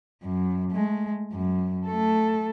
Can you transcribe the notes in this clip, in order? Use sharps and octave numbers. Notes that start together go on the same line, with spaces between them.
F#2
G#3 A3
F#2
A3 A4